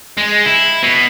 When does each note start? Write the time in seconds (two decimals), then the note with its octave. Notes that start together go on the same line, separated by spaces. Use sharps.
0.17 G#3
0.45 E4
0.83 B2